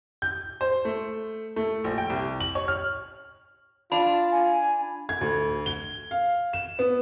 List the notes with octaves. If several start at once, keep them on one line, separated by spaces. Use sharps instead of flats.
G6
C5
A3
A3
A#1
G5
C2
F#7
C#5
F6
D4 F4 B5
G#5
G#6
D2
G7
F5
E7
B3